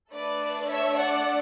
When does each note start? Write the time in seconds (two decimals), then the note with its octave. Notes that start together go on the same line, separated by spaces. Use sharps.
0.12 A3 D4 A4 B4 D5
0.68 C#5 E5
0.96 D5 F#5